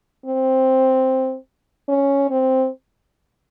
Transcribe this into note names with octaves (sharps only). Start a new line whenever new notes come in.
C4
C#4
C4